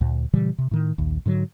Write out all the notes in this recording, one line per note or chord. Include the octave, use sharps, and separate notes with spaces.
D2 A#2
A#2 C#3 E3 G3
C3
A2 D#3
A#1 D#2
G#2 D3 F#3